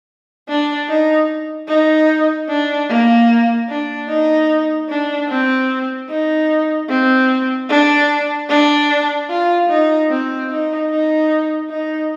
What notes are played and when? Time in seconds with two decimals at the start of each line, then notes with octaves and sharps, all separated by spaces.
0.48 D4
0.89 D#4
1.68 D#4
2.48 D4
2.89 A#3
3.69 D4
4.09 D#4
4.89 D4
5.29 C4
6.09 D#4
6.89 C4
7.69 D4
8.49 D4
9.29 F4
9.69 D#4
10.09 C4
10.49 D#4
10.89 D#4
11.69 D#4